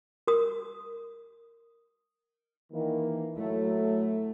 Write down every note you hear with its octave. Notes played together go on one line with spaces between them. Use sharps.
A#4 D#6
D#3 E3 A#3
F#3 A3 E4 A4